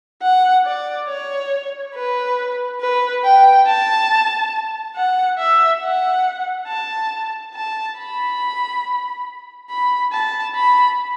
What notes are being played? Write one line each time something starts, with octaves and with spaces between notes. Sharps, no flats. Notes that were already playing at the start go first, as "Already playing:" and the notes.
F#5
D5
C#5
B4
B4
G5
A5
F#5
E5
F#5
A5
A5
B5
B5
A5
B5